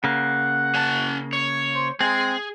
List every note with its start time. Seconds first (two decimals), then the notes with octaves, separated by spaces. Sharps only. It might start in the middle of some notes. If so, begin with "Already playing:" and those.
0.04 C#3 A#3 F#5
0.75 C#4 A5
1.33 C#5
1.75 C5
2.01 G#3 C4 G#4